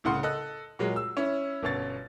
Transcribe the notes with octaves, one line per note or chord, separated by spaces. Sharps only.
C2 A2 C#3 F#5 C6
A4 D#5 F#6
A#2 F#3 G#3
E6
C#4 E4
G1 B2 C#4 A6